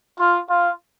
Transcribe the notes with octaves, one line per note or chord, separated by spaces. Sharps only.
F4
F4